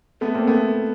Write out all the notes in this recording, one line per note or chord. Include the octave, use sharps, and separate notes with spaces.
A3 B3
A#3 C4
A3 B3